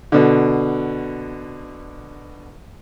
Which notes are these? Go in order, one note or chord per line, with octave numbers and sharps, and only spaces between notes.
B2 D3